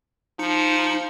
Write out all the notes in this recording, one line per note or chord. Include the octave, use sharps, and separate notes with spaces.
F3 D#4 C#7